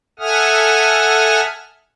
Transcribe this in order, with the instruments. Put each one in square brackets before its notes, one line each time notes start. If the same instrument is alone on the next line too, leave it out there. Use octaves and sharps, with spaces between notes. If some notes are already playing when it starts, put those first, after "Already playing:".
[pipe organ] A4 E5 F#5 G#5 D#6 F6